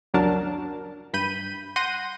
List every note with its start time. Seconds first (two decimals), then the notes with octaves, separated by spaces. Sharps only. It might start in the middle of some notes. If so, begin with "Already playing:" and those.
0.14 C#2 F#2 F#3 D4 A#4 A5
1.13 G2 B5 G6 D#7
1.76 F#5 C6 G6 A#6 D#7